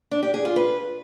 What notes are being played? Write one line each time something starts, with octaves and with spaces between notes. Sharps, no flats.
D4
G4
G#4
F4
B4